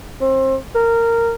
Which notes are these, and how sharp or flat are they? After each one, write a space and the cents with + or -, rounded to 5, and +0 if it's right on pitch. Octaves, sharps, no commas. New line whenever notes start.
C4 +30
A#4 -15